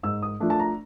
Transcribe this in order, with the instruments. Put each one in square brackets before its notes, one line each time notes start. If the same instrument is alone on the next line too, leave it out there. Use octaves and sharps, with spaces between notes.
[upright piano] G#2 E6
D#6
F3 A3 D4
A5
A#5